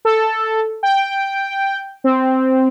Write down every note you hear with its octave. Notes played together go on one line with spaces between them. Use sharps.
A4
G5
C4